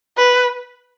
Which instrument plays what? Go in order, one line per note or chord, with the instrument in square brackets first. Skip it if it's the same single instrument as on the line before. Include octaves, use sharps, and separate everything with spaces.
[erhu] B4